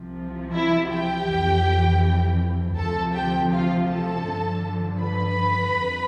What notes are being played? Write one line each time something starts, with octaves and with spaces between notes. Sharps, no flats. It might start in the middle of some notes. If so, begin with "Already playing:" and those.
Already playing: C2 C3 F3
E4 E5
G4 G5
F2 E3
D2 C3 F3 A4 A5
G4 G5
F4 F5
A4 A5
G2 D3 F3
B4 B5
F2